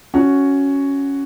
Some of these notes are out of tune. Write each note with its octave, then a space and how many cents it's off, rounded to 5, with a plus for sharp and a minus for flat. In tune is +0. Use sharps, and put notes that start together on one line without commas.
C#4 +5 F#4 +0